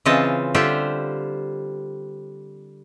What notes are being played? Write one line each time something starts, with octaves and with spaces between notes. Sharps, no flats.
C#3 E3 C4 F4 D#5 A5
D3 G3 F4 G4 C5 E5